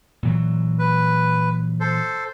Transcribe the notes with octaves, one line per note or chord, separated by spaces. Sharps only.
A#2 E3 F#3
B4
A4 C5